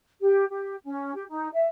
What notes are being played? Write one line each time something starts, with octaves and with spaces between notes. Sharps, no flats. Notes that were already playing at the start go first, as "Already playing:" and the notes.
G4
G4
C#4
G4
D#4
E5